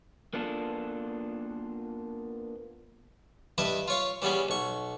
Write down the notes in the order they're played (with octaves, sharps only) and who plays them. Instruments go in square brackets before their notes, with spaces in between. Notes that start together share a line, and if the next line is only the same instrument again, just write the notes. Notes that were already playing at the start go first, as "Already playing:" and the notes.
[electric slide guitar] A#3 B3 D4 F4 A4
[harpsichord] G2 E4 B4 D#5 E5 D#6
F4 C#5 F5
E3 G3 B3 C#4 G#4
B1 C#6